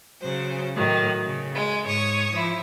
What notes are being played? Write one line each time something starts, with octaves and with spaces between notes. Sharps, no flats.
C#3 F#3 C5
A2 D#3 F#3
C#3
G#3
G#2 C#5 C#6 D#6
F3 E4